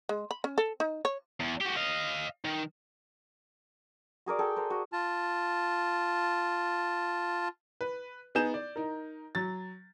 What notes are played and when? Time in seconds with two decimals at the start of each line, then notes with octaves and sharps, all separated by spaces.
0.09 G#3
0.31 B5
0.44 C#4
0.58 A4
0.80 D#4
1.05 C#5
1.40 E2
1.61 F#4 G4
1.77 D#5 F5
2.45 D#3
4.26 F#4 G#4 A#4 D5
4.39 G#4 A4 G5
4.56 A#4 C5
4.70 F#4
4.93 F4 A5
7.81 B4
8.35 B3 D#4 G#4 G6 E7
8.54 D5
8.76 D#4 A#4
9.35 F#3 A6